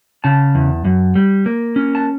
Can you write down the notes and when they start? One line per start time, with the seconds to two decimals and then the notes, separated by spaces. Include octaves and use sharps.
0.24 C#3 A5
0.55 E2
0.85 F#2
1.15 G3
1.46 A#3
1.76 C#4
1.95 A5